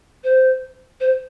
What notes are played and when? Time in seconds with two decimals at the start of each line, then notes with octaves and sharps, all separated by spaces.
0.24 C5
1.00 C5